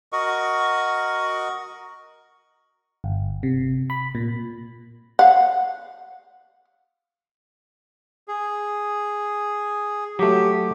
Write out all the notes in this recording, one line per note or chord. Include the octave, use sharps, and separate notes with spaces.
F#4 A#4 D#5 C#6
G1
C3
B5
A#2
F5 F#5
G#4
F#3 A3 G4